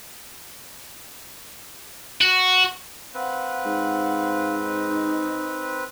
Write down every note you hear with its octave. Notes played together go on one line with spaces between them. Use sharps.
F#4
C4 B4 F5 F#5
G#2
D#4